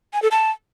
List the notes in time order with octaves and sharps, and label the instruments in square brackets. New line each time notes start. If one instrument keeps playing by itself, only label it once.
[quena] G#5
A4
A5